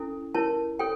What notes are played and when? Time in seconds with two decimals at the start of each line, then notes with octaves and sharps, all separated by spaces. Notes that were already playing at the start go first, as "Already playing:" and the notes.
Already playing: C#4 E4 A4
0.35 E4 A#4 C#5 A5
0.79 A4 C#5 G5